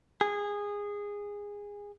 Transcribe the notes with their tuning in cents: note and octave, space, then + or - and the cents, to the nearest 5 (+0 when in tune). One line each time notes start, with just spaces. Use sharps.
G#4 -20